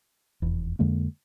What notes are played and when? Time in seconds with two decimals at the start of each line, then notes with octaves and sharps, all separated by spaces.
0.42 F1 E2
0.79 F2 D3 G#3 A#3